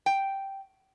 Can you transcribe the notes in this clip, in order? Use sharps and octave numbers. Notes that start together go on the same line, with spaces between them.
G5